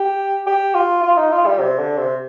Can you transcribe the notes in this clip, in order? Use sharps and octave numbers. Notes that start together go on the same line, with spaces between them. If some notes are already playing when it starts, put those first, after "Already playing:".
Already playing: G4
G4
F4
F4
D#4
F4
G3
C3
D3
C3